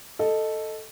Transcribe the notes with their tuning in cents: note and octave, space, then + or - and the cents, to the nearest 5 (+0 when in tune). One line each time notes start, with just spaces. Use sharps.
A4 +0 D#5 +0